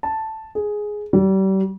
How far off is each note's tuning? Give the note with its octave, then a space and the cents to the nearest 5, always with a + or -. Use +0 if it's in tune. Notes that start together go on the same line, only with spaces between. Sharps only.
A5 +0
G#4 +5
G3 -35